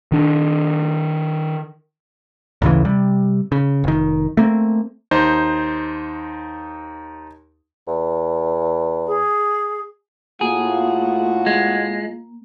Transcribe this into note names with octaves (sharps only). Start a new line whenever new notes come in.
D#3 D4
A1 D2 C#3 E3
C3 G3
C#3
F1 D#3
A3 A#3 C4
D#2 D#4 C5
E2
G#4
A2 A3 A#3 F4 F#4 G#4
G#3